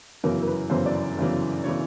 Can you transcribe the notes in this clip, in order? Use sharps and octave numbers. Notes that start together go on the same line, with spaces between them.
G1 F#2 C#3 E3 A#4
A#4
B4
G1 F#2 C#3 E3 C5
D5
G1 F#2 C#3 E3
C#3 E3 C#5